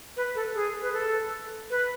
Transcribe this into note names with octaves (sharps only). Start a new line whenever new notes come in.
B4
A4
G#4
B4
A4
B4